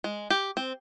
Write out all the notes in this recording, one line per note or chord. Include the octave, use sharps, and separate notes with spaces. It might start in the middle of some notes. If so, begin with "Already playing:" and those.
G#3
G4
C4